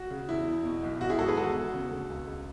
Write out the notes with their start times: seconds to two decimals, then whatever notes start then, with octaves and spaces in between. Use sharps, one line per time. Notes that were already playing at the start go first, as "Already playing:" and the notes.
Already playing: F#4
0.11 C#3
0.29 E2 E4
0.47 E2
0.65 B2
0.83 B1
1.01 G#1 F#4
1.10 E4 G#4
1.19 G#2 F#4 A4
1.28 G#4 B4
1.37 E2 F#4 A4
1.55 E2
1.73 C#3
1.91 D2
2.10 C#2
2.27 C#2